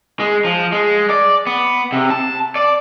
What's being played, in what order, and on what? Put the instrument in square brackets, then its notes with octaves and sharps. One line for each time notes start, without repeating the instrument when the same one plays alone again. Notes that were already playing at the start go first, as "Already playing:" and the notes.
[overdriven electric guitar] G#3
F3
G#3
D5
B3
C3
A5
D5